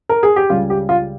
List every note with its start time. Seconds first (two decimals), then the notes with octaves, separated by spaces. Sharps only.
0.09 A#4
0.23 G#4
0.36 G4
0.50 C#2 C#3 G3 F4
0.70 G4
0.89 F4